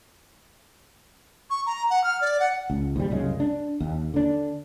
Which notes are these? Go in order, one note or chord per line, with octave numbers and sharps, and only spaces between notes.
C#6
A#5
F#5
F6
D5
F#5
C#2
D#2 G#2 G3
C2 F#2 C#3 G#3
D4
D#2
D3 D4